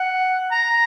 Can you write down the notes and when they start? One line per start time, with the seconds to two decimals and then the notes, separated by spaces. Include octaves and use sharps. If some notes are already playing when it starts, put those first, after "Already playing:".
Already playing: F#5
0.52 A#5